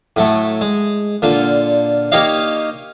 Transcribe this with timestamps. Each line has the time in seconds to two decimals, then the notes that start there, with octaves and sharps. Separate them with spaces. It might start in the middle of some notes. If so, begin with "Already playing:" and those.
0.16 A2 F#3 A3
0.61 G#3
1.22 A#2 D3 F4
2.12 A#3 D#4 G4 C#5 D#5 F5